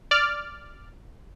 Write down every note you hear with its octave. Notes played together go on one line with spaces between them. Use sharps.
D5 F6